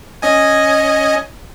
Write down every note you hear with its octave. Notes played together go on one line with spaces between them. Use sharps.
C#4 D#5 G#5